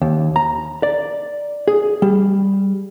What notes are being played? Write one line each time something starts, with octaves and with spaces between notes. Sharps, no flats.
D#2
A#5
D5
G#4
G3